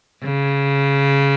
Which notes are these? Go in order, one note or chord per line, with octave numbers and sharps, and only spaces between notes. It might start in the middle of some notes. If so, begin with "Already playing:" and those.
C#3